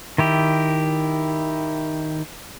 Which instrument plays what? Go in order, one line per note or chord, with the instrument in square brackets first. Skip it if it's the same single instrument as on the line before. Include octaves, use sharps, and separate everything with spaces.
[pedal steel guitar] D#3 E4 G4